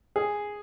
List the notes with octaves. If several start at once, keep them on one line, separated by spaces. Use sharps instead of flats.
G#4